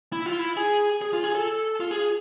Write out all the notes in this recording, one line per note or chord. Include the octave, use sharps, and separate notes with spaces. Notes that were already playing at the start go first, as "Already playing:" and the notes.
E4
F4
E4
G#4
G#4
F4
G#4
A4
F4
G#4